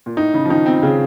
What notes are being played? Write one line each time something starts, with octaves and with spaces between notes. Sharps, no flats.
A#2
A2 D#4
C#3
F3
D#3 D#4
C4
C#3 C4